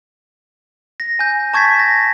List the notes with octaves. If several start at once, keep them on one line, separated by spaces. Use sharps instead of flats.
A#6
G#5 G6
A5 C#6 G#6 A6 B6
A#6